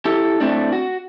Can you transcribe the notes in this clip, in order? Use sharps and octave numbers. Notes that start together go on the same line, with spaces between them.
E4 G4 A4
A2 A3 C4 D4
F#4